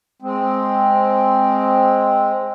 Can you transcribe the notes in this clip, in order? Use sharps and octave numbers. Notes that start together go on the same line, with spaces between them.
G#3 C4